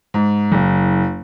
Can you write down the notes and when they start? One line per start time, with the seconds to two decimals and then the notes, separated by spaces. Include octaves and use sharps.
0.14 G#2
0.52 F#1